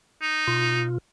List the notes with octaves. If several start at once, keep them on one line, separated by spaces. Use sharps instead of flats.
D#4
B2 F4